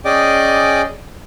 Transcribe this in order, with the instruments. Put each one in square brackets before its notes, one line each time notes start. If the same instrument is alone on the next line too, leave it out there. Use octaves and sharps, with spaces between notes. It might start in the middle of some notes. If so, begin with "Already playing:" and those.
[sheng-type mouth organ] C#4 G#4 D5 D#5 G5 D6